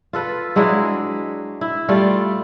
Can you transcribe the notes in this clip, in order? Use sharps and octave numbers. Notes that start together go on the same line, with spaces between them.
F4 A4 B4
F#3 G#3 D4 E4
E4
G3 A3 F4 D5